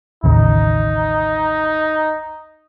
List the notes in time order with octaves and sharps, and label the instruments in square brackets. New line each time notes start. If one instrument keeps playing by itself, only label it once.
[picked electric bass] A1 D#2 C#3 [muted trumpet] D#4